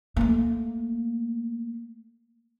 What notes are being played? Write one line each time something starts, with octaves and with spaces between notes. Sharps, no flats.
A3 A#3